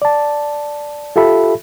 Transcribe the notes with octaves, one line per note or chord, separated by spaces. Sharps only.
D5 A5
F4 G4 A4 E5 B5